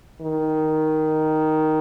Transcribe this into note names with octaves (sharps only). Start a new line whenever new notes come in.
D#3